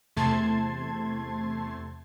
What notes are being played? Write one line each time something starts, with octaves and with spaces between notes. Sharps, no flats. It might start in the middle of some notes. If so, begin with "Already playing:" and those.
E2 C3 A3 A5 C6 G#6